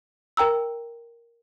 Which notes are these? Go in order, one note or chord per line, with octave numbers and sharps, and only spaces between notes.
A#4 G5 A#5 E6